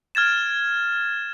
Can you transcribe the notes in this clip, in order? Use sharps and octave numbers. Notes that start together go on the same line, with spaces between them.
F6 G#6 A6 E7